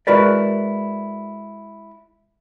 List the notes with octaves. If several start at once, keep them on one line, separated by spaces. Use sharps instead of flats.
G#3 E4 F#4 A#4 B4 D5